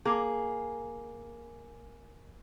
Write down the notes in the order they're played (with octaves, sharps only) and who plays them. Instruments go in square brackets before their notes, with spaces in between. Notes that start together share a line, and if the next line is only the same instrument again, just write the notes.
[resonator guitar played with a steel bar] A#3 G#4